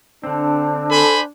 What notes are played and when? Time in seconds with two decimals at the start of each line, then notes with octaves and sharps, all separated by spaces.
0.24 D3 C4 D4
0.91 A4 C5 G#5 B5